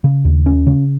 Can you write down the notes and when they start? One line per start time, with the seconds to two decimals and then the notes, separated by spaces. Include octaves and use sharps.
0.04 C#3
0.25 D#2
0.46 C#4
0.67 C#3